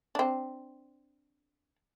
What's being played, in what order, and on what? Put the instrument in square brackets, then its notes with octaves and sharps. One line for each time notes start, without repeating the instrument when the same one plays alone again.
[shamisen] C4 D4